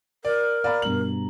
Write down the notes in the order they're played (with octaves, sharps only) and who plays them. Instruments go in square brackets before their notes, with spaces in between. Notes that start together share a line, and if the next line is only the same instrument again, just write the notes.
[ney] A#4 [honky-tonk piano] D5
[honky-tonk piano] D5 [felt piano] F5 A#5 B5
[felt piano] G2 B2 A#5 [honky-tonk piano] F#7